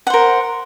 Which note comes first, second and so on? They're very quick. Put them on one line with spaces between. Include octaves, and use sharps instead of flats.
F#5 C5 A#4